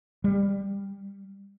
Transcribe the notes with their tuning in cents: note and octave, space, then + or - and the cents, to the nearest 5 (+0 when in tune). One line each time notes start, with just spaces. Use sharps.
G3 +15